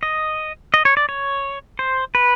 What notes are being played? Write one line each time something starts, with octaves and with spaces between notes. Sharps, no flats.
D#5
D#5
C#5
D5
C#5
C5
B4